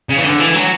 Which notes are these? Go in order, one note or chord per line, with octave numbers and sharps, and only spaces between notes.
C#3
E3
D3
E3
F#3